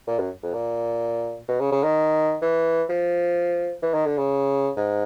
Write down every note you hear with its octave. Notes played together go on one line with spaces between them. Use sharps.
A#2
F#2
F2
A#2
B2
C#3
C#3
D#3
E3
F3
E3
D#3
D3
C#3
G#2